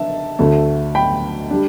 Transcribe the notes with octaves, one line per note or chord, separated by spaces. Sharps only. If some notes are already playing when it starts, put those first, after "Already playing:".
Already playing: D4 E5 A5
D2 D3 A3
G5 B5
G3 D4